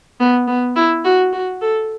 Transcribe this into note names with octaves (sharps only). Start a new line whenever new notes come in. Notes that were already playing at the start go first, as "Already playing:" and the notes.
B3
B3
E4
F#4
F#4
A4